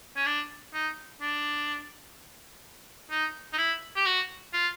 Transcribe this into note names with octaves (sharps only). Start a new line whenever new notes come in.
C#4
D4
D#4
D4
D#4
D#4
E4
G4
F#4
F4